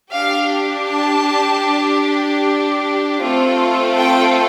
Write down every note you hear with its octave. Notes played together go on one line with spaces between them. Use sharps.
D4 G4 F5
A5
A3 C4 F4 A4
G5